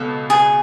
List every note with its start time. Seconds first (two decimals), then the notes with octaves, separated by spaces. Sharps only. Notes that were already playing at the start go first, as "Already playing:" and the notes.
Already playing: C#2 B2 A4
0.30 G#4